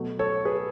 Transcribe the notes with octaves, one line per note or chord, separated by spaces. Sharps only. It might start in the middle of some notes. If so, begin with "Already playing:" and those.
Already playing: B2 F#3 A3
A4 C#5
G#4 B4